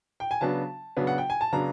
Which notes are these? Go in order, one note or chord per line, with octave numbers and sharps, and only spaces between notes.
G5
G#5
C#3 F#3 B3 D4 A5
C#3 F#3 B3 D4
F#5
G5
G#5
A5
C#3 F#3 B3 D4 A#5